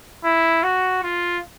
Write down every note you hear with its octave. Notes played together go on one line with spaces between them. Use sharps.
E4
F#4
F4